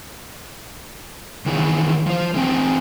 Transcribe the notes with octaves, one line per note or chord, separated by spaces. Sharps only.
D#3 E3 G#4 C#5
F3 C5
E3 A3 C4 G5 G#5